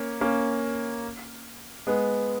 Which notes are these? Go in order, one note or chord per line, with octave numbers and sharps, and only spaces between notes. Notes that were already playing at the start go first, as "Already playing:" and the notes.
Already playing: A#3 C#4
A#3 C#4
G#3 B3